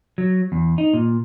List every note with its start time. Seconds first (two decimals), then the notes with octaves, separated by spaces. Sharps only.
0.18 F#3
0.52 E2
0.78 D#4
0.93 A#2